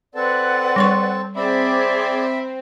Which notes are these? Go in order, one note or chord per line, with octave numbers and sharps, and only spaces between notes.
C4 A4 B4 D5 F#5
G3 C6 C#6
C4 G#4 D5 E5 B5 D6